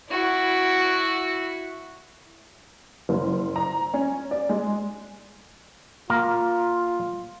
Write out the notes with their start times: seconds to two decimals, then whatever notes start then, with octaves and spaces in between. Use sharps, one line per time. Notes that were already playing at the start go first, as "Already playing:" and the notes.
0.11 E4 F#4
3.09 F#1
3.56 A#5
3.94 C#4
4.31 D5
4.49 G#3
6.10 A#3 F4 A#4